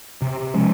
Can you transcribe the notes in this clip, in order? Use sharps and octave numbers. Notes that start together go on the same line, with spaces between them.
C3
F3 G#3 C#4